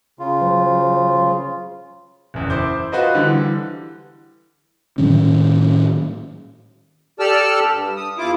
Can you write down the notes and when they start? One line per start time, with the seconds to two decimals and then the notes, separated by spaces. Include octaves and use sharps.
0.19 C#3 F4
0.41 F#3 C5
2.34 F#1 E2
2.50 E4 C5 D6 G6
2.92 F4 F#4 B4 C5 D#5
3.15 D3 E3 G3
4.98 A2 D#3 F#3 C#4
7.20 G4 A4 D5 A5 E6 F6
7.70 G2
7.97 D#6
8.18 E2 E4 F4 D6